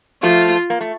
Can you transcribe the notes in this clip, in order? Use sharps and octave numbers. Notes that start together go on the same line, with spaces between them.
F3 A3 F4
A#3
A3